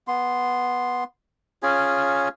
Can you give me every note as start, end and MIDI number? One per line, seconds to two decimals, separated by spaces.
0.08 1.04 59
0.08 1.04 84
1.63 2.29 61
1.63 2.29 65
1.63 2.29 68
1.63 2.29 80